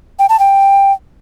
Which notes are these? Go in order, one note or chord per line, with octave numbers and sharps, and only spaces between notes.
G5
A5
G5